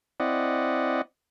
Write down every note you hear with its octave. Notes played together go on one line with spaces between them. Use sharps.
C4 E4 D5 D#5 F#5